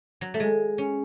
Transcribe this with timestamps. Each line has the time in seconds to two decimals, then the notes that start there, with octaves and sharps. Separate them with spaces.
0.21 F#3
0.34 A3
0.40 G#3
0.78 C#4